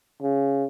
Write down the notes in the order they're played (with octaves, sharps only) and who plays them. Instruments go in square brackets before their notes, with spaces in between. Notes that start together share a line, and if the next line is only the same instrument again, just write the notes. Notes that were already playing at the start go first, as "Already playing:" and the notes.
[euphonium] C#3